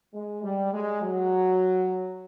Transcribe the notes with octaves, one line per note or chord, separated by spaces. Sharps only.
G#3
G3
G#3
F#3